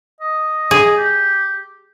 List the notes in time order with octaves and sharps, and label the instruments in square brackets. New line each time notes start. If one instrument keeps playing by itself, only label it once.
[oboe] D#5
[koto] G#4
[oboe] G4